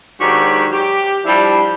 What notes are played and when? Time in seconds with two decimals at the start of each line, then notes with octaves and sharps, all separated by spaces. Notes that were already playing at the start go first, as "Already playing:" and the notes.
0.20 G#2 D#3 F#3 D4 F#4 G4
0.71 G4
1.25 F3 G3 D4 E4